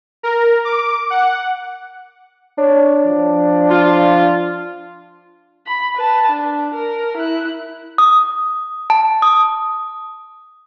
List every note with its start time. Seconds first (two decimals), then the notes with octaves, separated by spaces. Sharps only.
0.23 A#4
0.65 D6
1.10 F#5
2.59 D4 C#5
3.06 F3
3.70 F4
5.67 B5
5.96 B4 A5
6.30 D4
6.74 A#4
7.17 E4 F#6
7.98 D#6
8.90 A5
9.22 D#6